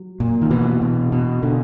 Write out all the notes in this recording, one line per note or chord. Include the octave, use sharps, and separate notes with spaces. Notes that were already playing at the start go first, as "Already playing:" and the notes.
Already playing: F#3
A#2
D#3
B2 E3
B2
B2
B2 D3